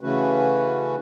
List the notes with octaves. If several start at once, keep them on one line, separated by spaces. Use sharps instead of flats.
C#3 E3 A3 C#4 F#4 B4